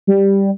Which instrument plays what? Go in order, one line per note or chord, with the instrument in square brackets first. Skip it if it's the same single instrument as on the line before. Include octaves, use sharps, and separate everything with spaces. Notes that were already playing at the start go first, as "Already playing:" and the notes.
[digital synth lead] G3